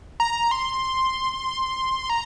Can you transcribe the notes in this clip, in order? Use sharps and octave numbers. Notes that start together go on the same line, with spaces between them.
A#5
C6
A#5